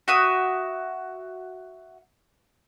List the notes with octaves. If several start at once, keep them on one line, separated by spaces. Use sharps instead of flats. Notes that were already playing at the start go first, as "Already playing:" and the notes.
F#4 E5 D#6